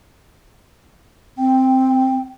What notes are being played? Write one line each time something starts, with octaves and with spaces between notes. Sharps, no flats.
C4 G5